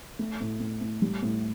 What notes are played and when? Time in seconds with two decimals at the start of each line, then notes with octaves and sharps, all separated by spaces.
0.19 A3
0.41 A2
0.60 A2
0.81 A2
1.02 G3
1.23 A2